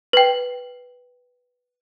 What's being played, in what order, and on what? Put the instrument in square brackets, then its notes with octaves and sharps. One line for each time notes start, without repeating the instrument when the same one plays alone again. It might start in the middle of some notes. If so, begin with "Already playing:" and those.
[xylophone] B4 G5